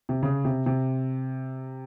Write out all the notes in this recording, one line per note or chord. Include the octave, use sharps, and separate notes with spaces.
C3
C#3
C3
C3